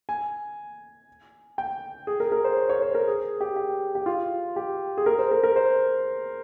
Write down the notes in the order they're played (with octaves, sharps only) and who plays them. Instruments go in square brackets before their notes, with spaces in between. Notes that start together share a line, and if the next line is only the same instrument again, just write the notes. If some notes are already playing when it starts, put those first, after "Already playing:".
[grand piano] G#5
G5
G#4
A#4
A#4
C5
C#5
C#5
C5
A#4
G#4
G4
G4
G4
F4
G4
G#4
A#4
C5
A#4
A#4
C5